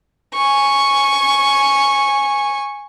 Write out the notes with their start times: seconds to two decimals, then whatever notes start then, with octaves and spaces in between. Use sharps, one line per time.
0.34 G#5 C#6